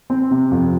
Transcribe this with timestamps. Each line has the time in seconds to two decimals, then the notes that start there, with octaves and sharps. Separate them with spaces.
0.10 C4
0.31 C3
0.51 F2